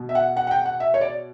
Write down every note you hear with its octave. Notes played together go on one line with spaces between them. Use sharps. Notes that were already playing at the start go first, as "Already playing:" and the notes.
Already playing: B2
E5
F#5
F#5
F#5
G5
F#5
E5
C#5
D5